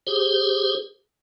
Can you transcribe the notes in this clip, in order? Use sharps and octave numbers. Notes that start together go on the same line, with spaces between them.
G4 G#4 C5